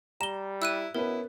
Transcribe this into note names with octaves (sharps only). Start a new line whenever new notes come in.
G3 A#5 E7 G7
E4 E6 F#6 D#7
B2 B3 C#4 E4 A#4 B4